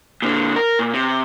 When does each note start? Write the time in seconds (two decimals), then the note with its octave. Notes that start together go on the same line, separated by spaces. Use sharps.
0.22 A#2 D3
0.56 A#4
0.79 A#2
0.94 C3